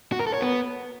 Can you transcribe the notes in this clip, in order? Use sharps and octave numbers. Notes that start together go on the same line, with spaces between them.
F#4
A#4
A4
C#5
B3